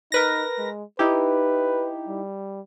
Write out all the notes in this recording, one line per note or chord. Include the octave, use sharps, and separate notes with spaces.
D#4 A#4 B4 A#6
G#3
D#4 E4 G4 B4
G3